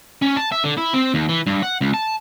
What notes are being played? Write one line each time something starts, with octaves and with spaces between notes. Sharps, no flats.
C#4
A5
E5
D3
E4
C4
D#2
E3
G2
F#5
C#2
A5